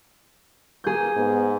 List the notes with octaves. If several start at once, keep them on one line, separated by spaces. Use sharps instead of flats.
A#3 G#4 G6
G#2 B3